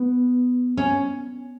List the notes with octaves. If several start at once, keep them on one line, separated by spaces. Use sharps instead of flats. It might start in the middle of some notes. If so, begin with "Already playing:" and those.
Already playing: B3
C#4